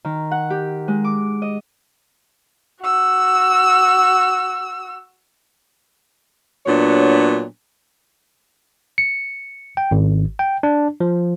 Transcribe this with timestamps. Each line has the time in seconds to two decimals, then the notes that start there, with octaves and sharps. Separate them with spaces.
0.05 D#3
0.31 F#5
0.50 G4
0.88 G#3
1.04 D6
1.42 D#5
2.81 F#4 E6
6.66 A#2 F#3 B3 D4 C#5
8.98 C#7
9.77 G5
9.91 G#1
10.39 G5
10.63 D4
11.00 F3